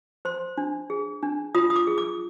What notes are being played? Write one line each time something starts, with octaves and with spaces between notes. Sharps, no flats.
C5 C6
D4
G#4
D4
F4 D#6
D#6
D6
G#4
D6